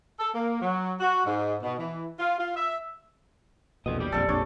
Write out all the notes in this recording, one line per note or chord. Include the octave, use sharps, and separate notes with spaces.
A4
A#3
F#3
F#4
G#2
B2
E3
F4
F4
E5
A#1 E2 B2 A4 D#5
G4 D5
A#1 F2 G3 C4 A4
A#1 F2 D4 A4 C#5